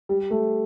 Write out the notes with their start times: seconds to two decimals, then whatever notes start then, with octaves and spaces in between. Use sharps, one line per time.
0.09 G3
0.31 A3